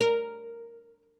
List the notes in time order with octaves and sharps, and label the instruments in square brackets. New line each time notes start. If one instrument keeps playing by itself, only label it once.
[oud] A#4